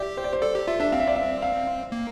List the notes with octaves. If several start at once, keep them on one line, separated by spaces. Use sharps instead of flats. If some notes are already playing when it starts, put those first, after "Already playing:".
Already playing: G4 D5 E5
C5
D5
C5
A4 D5
G4
F4 E5
D4 E5
C4 F5
E5
D5
E5
F5
A#3